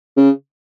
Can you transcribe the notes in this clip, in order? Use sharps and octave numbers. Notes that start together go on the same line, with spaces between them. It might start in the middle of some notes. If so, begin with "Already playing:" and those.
C#3